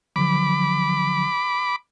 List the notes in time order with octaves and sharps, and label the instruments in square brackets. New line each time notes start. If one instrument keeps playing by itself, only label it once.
[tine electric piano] D3 F3 F#3 [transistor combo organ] B5 D6